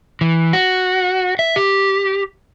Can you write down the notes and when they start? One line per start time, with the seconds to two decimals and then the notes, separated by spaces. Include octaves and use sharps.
0.21 E3
0.53 F#4
1.39 E5
1.56 G4